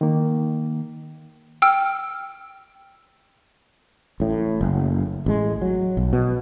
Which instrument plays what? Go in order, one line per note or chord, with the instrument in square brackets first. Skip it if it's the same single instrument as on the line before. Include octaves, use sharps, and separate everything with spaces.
[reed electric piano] D#3 A#3
[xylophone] G5 E6 F6
[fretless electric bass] A1 A2
F#1
A1 G#3
F#3
B1
B2